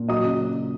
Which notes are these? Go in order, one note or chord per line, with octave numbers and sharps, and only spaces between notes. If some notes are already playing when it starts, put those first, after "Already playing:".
Already playing: A#2
F#3 D#5 D#6
C#3